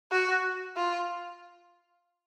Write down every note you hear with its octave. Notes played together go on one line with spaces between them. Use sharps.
F#4
F4